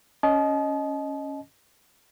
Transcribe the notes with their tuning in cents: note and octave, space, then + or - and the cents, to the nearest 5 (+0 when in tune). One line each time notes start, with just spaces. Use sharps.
C#4 +0 D#5 +0 A5 -45